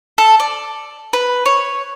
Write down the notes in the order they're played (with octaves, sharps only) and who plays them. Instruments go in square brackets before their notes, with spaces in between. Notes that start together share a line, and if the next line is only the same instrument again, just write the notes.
[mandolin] A4
D5
B4
C#5